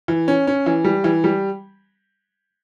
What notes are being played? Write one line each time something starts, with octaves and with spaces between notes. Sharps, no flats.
E3
C#4
C#4
E3
G3
E3
G3